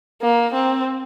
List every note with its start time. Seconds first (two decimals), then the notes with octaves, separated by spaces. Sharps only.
0.22 A#3
0.54 C4